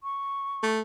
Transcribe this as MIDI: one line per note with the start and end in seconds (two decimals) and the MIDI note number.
0.03 0.68 85
0.63 0.81 57